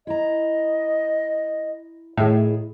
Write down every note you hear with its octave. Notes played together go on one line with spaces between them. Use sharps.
E4 D#5 A#5
A2 D#3 E4 G#4